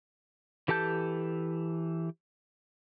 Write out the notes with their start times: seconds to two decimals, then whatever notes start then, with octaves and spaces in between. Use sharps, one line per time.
0.68 E3 G4 A4 A5 G6